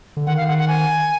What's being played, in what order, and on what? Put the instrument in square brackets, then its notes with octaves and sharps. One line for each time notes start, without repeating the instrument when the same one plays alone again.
[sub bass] D3
[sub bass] D#3 [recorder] F#5
[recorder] F5
F#5
F#5
G#5